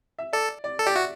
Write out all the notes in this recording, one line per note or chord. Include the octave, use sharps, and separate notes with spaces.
E5
A4 D5
D5
A4
G4 D5
F#4 E5